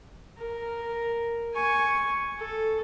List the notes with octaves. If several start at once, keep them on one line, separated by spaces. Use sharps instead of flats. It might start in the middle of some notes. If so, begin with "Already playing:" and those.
A#4
G#5 C#6
A4